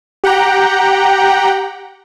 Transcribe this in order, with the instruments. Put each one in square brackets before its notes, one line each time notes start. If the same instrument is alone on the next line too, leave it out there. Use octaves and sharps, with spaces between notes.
[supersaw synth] G4 F#5 G5 A#5